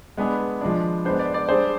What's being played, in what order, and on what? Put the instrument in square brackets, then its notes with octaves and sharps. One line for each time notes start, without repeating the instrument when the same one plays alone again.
[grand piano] G#3 B3 D4 G#4 [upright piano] B4
[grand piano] F3 G#3 D4
[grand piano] G#3 B3 D4 [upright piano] C5
[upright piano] D5
D5
[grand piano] G3 D4 G#4 [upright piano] C5